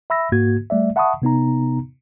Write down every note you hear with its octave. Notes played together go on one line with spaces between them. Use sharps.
E5 B5 E6 A#6
G#2 A#3 F#4 G#6
G3 A3 D5 E5
E5 F#5 A5 B5 C#6 D#6
C3 B3 D#4 A#5